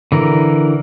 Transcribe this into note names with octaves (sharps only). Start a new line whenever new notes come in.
D3 E3 A#4